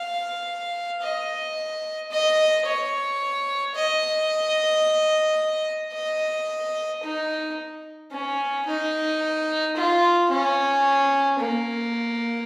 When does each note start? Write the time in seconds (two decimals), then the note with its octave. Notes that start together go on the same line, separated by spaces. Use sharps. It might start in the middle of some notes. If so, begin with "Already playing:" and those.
Already playing: F5
1.02 D#5
2.11 D#5
2.66 C#5
3.75 D#5
5.93 D#5
7.03 D#4
8.12 C#4
8.66 D#4
9.76 F4
10.31 C#4
11.39 A#3